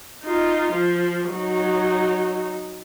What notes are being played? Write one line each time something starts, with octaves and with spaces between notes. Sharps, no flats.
D#4 F4
F3
F#3 D#4